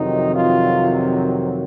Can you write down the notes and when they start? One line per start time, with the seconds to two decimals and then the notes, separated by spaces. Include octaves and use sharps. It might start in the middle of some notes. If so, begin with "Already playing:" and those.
Already playing: F2 C3 D#3 F#3 D#4
0.35 F4